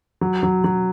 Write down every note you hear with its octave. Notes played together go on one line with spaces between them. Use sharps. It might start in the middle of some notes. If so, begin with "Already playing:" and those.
F#3
F#3
F#3